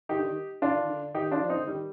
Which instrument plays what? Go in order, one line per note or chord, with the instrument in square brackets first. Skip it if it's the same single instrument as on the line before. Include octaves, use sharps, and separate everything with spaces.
[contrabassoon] D#3 [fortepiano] D#4 G4
[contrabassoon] D3
D#3
[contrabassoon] D#3 [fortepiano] D4 F4
[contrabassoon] D3
D#3
D3
[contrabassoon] D#3 [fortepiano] D#4 G4
[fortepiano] D4 F4
[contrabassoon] F3
[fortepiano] C4 D#4
[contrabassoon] D3
[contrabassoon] D#3 [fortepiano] G3